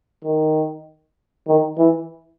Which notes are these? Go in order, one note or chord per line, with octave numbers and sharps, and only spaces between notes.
D#3
D#3
E3